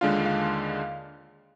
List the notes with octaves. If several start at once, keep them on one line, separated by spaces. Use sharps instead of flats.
D#2 D3 G#3 D4 F4 F5
F5